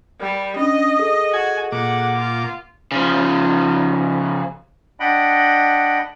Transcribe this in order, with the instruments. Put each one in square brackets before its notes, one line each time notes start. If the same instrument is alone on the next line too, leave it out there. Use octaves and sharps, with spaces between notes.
[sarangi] G3 [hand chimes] A#4 B5
[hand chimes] C#4 D4 [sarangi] D#5
[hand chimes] G#4 A4
[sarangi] F#4 [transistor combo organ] G#5
[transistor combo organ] A#2 D6 [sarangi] F#5
[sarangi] F4
[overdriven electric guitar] C#3 F3
[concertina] D4 D#5 F#5 G5 B5